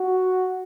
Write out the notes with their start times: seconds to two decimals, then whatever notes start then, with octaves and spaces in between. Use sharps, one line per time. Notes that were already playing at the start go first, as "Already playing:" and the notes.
Already playing: F#4